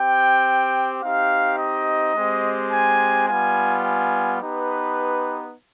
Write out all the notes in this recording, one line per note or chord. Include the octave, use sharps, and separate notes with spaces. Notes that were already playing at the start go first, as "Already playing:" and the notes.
Already playing: C4 G4 G5
C4 D#4 G4 F5
D#5
G#3 C4 G4
G#5
G3 B3 F4 G#5
G#5
B3 D#4 G4 B4